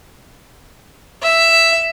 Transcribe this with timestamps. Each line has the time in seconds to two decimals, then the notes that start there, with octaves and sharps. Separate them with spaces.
1.22 E5